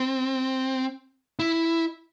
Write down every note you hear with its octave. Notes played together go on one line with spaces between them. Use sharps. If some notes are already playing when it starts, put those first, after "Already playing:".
Already playing: C4
E4